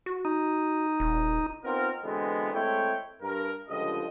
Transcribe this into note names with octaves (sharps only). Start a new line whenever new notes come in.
F#4
D#4
D#1
B3 C4 D#4 F4 A#4
B2 D3 E3 G#3 B3 C4
G#3 A3 C4 E4 C#5 G5
G2 A#4
C#2 D3 F3 G3 D#5